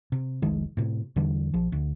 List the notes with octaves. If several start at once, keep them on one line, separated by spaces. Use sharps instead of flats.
C3
F1 C2 D#3 G#3
A2 C3
E2 D3 E3 G3
A#1 F3
D2